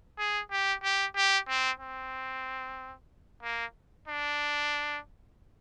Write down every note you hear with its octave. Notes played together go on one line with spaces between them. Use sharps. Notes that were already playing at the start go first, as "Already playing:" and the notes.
G#4
G4
G4
G4
C4
C4
A#3
D4